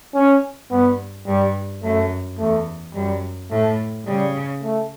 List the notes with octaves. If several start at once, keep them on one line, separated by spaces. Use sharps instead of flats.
C#4
G2 B3
G2 G3
F#2 A3
E2 A3
F#2 G3
A2 A3
C#3 G3
A3